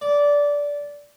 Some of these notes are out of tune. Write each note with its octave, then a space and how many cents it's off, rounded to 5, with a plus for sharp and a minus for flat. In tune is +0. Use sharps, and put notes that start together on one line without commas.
D5 -15